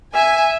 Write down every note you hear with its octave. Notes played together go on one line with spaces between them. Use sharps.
E5 G#5